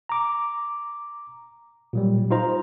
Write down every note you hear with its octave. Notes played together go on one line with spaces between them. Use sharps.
A#5 D6
A#2 F#3 G3
D#4 F4 C5 A#5